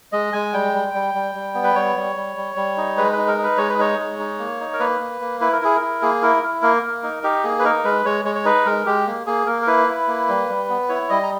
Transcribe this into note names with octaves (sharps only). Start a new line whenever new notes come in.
G#3 D#5
G#3 G#5
G3 G5
G3
G3
G3
G3
B3
B4
G3 C#5
G3
G3
G3
G3
D#4
G#3 B4
B4
D#4
A#4
D#4 B4
G#3 C#5
B4
D#4 C#5
G#3
D#4
A#3
D#4
A#4
A#3 B4
A#3
A#3
E4 B4
A#4
E4 G#4
A#4
E4
A#3 G#4
E4 A#4
E4
A#3 A#4
A#3
D#4
D#4 G4
A#3 G#4
B4
D#4 A#4
G#3 B4
G#3 C#5
G#3 C#5
C#5
D#4 B4
G#3 A#4
G#3 G4
A#3
A#3 G#4
A#3 A#4
A#4
E4 B4
E4
A#3
G3
G3
B3
E4 C#5
G3 D#5
A#5